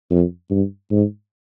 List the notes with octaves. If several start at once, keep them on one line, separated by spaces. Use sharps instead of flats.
F2
G2
G#2